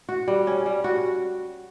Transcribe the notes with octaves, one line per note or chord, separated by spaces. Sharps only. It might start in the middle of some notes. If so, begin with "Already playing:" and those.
F#4
G3
C#4
G3
F#4